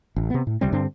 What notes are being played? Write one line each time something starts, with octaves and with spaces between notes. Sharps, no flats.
A1
C3 B3
A2
C#2 C3 G3 C4
G2 D3 C4 D4